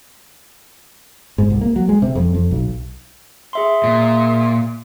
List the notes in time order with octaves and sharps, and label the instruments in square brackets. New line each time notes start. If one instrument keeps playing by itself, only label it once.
[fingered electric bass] G#2
C2
A#3
F#3
G#3
C3
F2
F2
B1
[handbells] G#4 E5 C6
[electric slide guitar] A#2